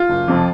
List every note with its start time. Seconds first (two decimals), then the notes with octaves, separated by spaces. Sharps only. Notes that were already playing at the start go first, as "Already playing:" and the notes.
Already playing: F4
0.09 F#1
0.28 F2 C3 F3